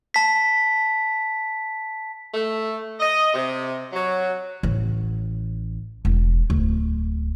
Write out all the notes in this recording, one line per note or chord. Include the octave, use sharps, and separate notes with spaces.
A5 B6
A3
D#5
C3
F#3
A1
E1
D1